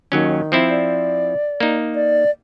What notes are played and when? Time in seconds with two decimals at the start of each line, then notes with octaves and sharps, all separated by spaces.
0.12 D#2 D#3 F#3 C#4
0.52 F3 C4 E4
0.70 D5
1.60 A#3 D#4
1.95 D5